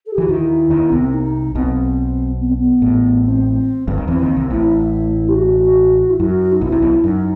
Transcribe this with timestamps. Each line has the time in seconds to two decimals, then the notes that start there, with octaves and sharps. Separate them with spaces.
0.05 A4
0.13 G4
0.18 E3 F#4
0.28 D#2 D#3 E4
0.70 D#2 D#3
0.89 C2 C3 B3
1.01 C4
1.13 D#4
1.55 B1 B2 C4
2.40 B3
2.49 C4
2.58 B3
2.82 A1 A2
3.24 C4
3.88 G1 G2
3.98 D#2 D#3
4.08 E2 E3 C4
4.22 D#2 D#3
4.36 C2 C3
4.50 A1 A2 E4
5.28 G4
5.34 F#4
6.09 E4
6.19 F#2 F#4
6.52 D#4
6.61 B1 B2 E4
6.72 C2 C3
6.82 B1 B2
7.04 F#2 D#4